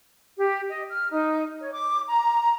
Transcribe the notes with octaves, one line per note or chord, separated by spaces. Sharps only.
G4
D#5
F6
D#4
C#5
D6
A#5